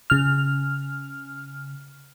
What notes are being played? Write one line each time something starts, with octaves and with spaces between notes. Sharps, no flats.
C#3 F6